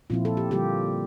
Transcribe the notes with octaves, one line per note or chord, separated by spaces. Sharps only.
A#2 F3 C4 E4 F4
A4
G4
D3 G3 A#3 F4 G4